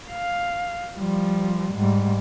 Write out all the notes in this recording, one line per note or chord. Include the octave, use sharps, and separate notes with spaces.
F5
F3 G3
G#2 G3